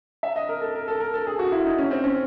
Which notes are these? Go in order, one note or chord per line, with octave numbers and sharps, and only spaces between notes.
E5
D#5
A#4
A4
A#4
A4
A#4
A4
G#4
F#4
E4
D#4
C#4
C4
C#4